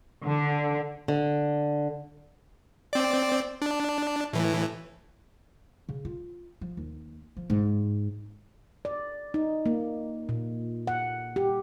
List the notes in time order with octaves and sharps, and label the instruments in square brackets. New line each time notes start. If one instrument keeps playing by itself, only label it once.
[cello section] D3
[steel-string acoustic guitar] D3
[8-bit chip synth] C4 D5
D4
A2 E3
[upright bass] C#3
F4
F3
D#2
F3
G#2
[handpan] D5
D#4
A#3
A#2
F#5
G4